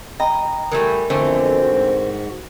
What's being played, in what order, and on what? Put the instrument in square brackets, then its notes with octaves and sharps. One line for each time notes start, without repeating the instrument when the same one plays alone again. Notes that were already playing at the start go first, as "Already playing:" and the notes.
[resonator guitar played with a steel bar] D#5 [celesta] G5 A#5 B5
[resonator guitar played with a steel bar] E3 G3 A3 [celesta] A#4
[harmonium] F2 B2 [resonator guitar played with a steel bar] D3 E3 A3 [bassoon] C4
[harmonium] G#2 F#4